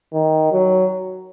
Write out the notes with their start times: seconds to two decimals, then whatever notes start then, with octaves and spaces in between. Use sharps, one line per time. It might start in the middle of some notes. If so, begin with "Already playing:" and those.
0.13 D#3
0.52 F#3